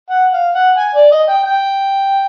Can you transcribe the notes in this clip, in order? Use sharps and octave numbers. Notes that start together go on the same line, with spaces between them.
F#5
F5
F#5
G#5
D5
D#5
G5
G5